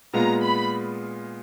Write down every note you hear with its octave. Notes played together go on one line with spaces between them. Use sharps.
A#2 G#3 B3 F4 A#5
B5